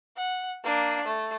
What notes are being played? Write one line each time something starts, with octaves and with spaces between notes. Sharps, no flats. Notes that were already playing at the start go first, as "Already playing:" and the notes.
F#5
A#3 D4
A3